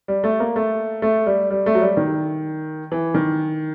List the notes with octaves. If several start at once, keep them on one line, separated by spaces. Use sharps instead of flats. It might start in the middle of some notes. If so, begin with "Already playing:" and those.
G3
A3
A#3
A3
A3
G3
G3
A3
F#3
G3
D#3
E3
D#3